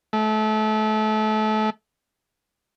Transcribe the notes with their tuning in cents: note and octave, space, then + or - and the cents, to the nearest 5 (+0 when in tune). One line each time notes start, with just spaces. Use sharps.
A3 -30